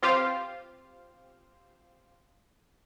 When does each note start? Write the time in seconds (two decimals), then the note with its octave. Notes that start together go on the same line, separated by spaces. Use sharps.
0.02 C4 F4 G4 C5 F5